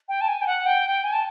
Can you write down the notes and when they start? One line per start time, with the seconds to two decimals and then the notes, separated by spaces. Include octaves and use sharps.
0.09 G5
0.21 A5
0.28 G#5
0.41 G5
0.47 F#5
0.66 G5
1.04 G#5
1.13 A5